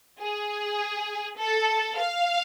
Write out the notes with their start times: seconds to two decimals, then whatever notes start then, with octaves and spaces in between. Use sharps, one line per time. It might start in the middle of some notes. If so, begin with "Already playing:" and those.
0.19 G#4
1.38 A4
1.98 F5